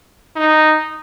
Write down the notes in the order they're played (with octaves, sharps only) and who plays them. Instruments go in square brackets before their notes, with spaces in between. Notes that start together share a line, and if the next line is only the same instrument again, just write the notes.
[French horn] D#4